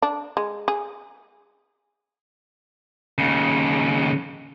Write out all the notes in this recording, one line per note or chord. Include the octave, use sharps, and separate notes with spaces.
D4
G#3
G#4
D#2 C#3